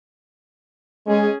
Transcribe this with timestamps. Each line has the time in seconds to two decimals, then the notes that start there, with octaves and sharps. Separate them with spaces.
1.07 G#3 C#4 G#4